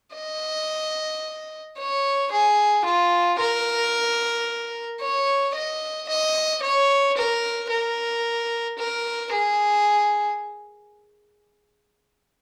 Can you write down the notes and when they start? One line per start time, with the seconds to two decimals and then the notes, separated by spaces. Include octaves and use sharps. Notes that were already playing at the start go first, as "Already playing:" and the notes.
0.15 D#5
1.77 C#5
2.32 G#4
2.85 F4
3.39 A#4
5.01 C#5
5.55 D#5
6.09 D#5
6.62 C#5
7.17 A#4
7.70 A#4
8.78 A#4
9.32 G#4